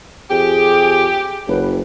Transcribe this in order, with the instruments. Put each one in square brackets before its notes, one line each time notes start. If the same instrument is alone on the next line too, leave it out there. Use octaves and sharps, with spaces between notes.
[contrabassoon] F2 [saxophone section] G4 [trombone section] G#4
[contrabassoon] F#1 [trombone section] F#3 B4